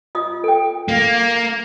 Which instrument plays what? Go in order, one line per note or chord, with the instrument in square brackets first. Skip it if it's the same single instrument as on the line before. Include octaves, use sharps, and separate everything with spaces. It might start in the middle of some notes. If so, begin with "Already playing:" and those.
[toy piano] F4 D#5 D#6
A4 G5
[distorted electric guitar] A#3